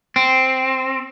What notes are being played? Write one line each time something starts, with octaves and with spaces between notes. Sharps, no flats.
C4